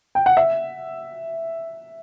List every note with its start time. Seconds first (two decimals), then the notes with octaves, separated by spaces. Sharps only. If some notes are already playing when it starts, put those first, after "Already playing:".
0.15 G5
0.26 F#5
0.37 E5